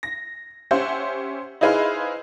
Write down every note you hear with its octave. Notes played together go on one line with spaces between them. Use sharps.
A#6
C#4 G4 C5 E5 F#5
D#4 E4 G#4 B4 C5 F5